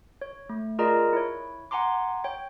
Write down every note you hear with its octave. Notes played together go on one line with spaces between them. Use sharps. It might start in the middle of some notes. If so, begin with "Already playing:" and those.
C#5
A3
F4 G#4 A#4 D5 D#5 A#5
E4 C#5
F#5 G#5 A#5 C6 D6
C#5 G5